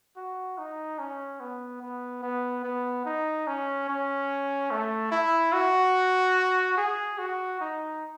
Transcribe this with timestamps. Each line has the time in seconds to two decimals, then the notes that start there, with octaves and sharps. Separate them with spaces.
0.17 F#4
0.58 D#4
0.99 C#4
1.40 B3
1.82 B3
2.23 B3
2.64 B3
3.06 D#4
3.47 C#4
3.89 C#4
4.71 A3
5.12 E4
5.53 F#4
6.77 G#4
7.18 F#4
7.61 D#4